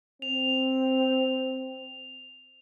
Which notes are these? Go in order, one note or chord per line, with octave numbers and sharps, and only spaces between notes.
C4 F7